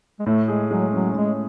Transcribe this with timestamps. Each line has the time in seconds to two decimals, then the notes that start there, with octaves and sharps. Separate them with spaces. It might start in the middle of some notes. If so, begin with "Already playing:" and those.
0.20 G#3
0.26 A2 A3
0.48 G#3 G#4
0.71 F#3 G#3
0.93 F#3 C#4
1.15 A2 G#3